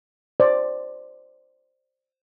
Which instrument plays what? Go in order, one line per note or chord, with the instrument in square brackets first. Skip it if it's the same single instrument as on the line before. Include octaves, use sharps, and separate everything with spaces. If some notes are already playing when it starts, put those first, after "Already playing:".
[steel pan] C5 D5